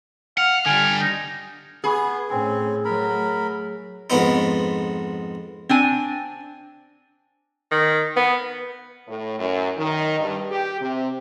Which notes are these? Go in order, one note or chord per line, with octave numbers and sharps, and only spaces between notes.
F5 F#5 F6
D3 G3 G#5
D#4
B3 G#4 G#5 B5 C#6
A2 C4 C#4 G5 G#5
F#3 A3 A#4 B5
F2 G#2 B3 D#4
C4 D4 G#5
D#3
B3
A2
F#2
D#3
G2
G4
C3